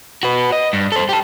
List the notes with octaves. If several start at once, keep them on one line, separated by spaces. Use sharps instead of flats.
F#4 B4
D#5
G2
A4 C5
G4 A5